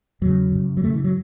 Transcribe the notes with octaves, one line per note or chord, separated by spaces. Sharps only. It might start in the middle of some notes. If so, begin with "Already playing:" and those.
E2 C#3 F#3
F#2 C#3
F#3
F#2 C#3 A3
E3
F#3